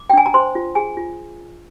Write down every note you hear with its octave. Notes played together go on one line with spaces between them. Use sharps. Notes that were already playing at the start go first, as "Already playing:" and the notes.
Already playing: D6
G5
D4 G#5
A#5
C5 C6
F4
G#4 G#5
F4